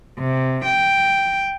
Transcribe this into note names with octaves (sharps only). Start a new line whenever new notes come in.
C3
G5